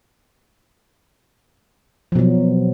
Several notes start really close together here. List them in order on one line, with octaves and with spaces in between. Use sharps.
F3 B2 F#3